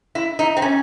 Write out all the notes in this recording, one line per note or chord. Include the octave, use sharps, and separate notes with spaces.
E4
D#4
C4
C#4